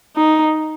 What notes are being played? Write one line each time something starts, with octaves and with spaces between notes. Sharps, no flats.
D#4